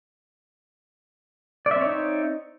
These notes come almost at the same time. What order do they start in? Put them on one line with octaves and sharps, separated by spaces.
D5 E5 C4 C#5 D#4